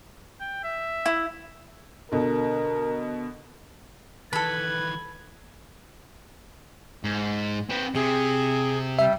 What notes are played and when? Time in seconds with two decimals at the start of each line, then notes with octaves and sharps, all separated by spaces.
0.40 G5
0.64 E5
1.06 E4
2.12 B2 D3 A#4
4.33 D#3 E3 A4 B4 B5 G#6
7.04 G#2
7.70 C4 B4
7.95 C3 G#4
8.99 G3 E5